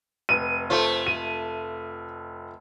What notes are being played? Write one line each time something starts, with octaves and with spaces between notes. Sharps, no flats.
F1 B4 D#7
A3 F4 C5
D#7